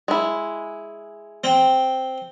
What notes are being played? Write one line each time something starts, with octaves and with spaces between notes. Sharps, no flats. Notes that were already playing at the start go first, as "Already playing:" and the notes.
G#3 E4
C4 G5